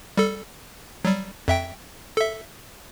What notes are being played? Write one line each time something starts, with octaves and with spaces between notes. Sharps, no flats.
G3 A4
F#3 G3
F2 E5 G5
A4 E5